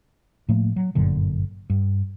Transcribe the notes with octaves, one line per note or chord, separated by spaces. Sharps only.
A2 F3 A3 A#3
F#3
G1 F#2 A#2 D3
G2